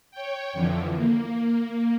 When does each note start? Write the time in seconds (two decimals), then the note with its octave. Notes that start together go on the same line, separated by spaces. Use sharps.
0.11 C#5 G5
0.53 F2 D3 E3 F3
0.96 A#3